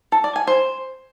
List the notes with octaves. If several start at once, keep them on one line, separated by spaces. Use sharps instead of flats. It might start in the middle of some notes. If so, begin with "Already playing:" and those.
A4
D5
G#5
C5